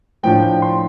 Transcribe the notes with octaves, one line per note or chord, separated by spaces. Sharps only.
A2 F3 D4 G5
G5
C6